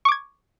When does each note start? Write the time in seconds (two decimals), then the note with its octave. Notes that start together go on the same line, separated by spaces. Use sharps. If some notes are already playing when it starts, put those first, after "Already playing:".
0.05 C#6
0.08 D6
0.12 G#6